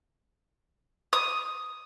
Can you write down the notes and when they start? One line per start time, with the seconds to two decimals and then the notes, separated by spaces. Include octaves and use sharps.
1.13 D#6